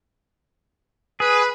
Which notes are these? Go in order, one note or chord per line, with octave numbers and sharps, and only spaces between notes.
G#4 B4